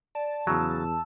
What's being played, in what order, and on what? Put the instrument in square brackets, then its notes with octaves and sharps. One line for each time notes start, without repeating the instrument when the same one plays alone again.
[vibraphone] D5 [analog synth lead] A5
[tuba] E2 [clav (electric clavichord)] C#3 F#3 [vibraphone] E6